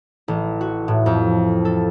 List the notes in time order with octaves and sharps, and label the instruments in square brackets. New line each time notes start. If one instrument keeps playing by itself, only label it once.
[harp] A1
F#4
A2
F2
A4